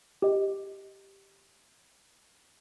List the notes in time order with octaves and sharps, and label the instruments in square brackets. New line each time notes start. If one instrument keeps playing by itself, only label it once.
[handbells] G4 D#5